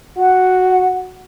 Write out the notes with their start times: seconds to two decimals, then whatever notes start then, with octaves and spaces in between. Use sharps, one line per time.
0.17 F#4 F#5